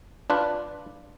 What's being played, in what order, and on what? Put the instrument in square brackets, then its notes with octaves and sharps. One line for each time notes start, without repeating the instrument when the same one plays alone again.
[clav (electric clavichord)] D4 F4 B4